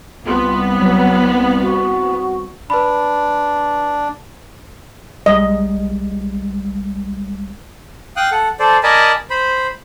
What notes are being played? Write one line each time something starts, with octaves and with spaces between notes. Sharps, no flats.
C2 B3 F4
F#3
F#4
D4 B4 B5
B1 G3 G#3 D#5
F5 G5 D#6 F#6
A4 F#5
A4 C5 D5
A#4 D5 D#5 G#5 A5 B5
C5 B5